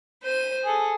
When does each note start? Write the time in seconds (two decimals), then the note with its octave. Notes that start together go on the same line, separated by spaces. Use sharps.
0.23 C5 D#7
0.64 G#4 A4